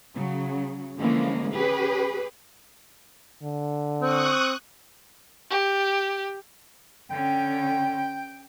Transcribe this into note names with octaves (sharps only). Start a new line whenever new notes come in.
C#3 F#3
D3 E3 F3 G#3 A#3 C#4
C#4 G4 G#4 B4
D3
C4 C#6 D#6 F#6
G4
D3 C#4 G5